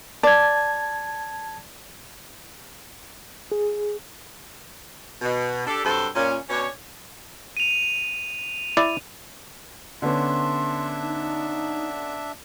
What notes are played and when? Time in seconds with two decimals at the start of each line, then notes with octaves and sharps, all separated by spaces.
0.23 D5 A5 G#6
3.52 G#4
5.21 B2
5.66 D4 G4 A4
5.84 G2 C3 F#3 F#4 A4 C5
6.15 A#2 C#4
6.49 B2 C#4 D4 C#5
7.57 D#7 F7
8.77 E4 D5
10.02 D3 B3 C#4 D4 E5 C6
11.01 D#4